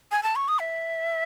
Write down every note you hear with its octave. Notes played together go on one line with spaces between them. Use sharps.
G#5
A5
C#6
D#6
E5